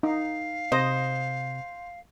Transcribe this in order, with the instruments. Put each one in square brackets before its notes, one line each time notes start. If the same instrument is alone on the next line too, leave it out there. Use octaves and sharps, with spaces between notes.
[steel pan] D#4 [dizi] F5
[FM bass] C3 [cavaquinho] C5 [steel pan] D#5